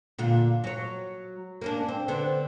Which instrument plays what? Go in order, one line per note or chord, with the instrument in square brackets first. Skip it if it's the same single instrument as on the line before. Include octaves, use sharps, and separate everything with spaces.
[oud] A#2 D3 F4
F#3 C#5
A#3 C#4 D4
C4
D3 B3 C4